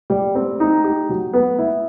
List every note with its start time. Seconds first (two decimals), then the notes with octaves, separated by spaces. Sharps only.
0.10 G3
0.35 C4
0.60 D#4
0.84 G4
1.09 F#3
1.33 B3
1.59 E4